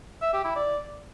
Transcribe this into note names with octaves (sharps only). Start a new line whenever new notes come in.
E5
G4
E4
D5